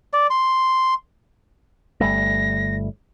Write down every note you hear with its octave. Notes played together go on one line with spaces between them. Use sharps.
D5
C6
G1 G3 A3 A#6